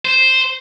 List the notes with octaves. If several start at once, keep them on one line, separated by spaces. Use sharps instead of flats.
C5